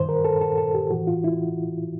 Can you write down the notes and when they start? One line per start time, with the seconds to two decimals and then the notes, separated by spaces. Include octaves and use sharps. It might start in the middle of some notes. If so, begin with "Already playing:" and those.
Already playing: G2 D#3 C5
0.09 A#4
0.25 A4
0.41 A4
0.58 A4
0.74 G4
0.91 A2 E3 F#4
1.07 F4
1.24 E4